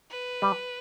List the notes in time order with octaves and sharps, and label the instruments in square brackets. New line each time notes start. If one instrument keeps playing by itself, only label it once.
[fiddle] B4
[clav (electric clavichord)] G3